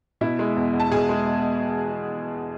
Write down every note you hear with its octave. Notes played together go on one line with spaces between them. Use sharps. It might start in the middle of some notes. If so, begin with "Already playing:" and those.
B2 E4 E5
G#3
E2
E2
A5
B2 G#4 G#5
G#3